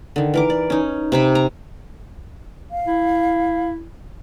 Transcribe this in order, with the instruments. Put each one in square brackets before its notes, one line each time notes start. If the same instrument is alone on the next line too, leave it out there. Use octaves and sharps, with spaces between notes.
[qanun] D3 D#3
E3 A#4 D6
D5
C#4 D#4
C3 A#5 B5
A#5
[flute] F5
[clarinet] E4